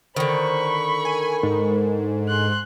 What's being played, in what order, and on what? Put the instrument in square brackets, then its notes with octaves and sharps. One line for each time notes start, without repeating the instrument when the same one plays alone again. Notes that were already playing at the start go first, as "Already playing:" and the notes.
[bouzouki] D3 D#3 [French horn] C5 [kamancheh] B5 C#6
[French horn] A#4 [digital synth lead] G#5
[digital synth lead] G#2
[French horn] G#3 [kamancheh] C6 F#6